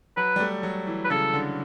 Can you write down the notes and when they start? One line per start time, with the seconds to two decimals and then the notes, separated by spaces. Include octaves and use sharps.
0.17 F#3 B4
0.36 G3
0.40 A3
0.63 F#3
0.87 E3
1.05 B4
1.10 C#3 A4
1.33 D3